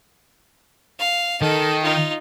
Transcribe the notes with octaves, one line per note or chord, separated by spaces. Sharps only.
F5
D#3 A4
D#4 F4